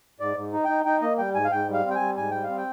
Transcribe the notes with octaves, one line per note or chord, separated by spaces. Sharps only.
G#2 D5
G#2
D#4
D#4 G5
D#4 G5
A#3 D#5
G3 G5
G#2 G#5
F5
G#2 G5
G3
F5
C4
G5
G3 G#5
G#2 G#5
G3 G5
F5
C4
G5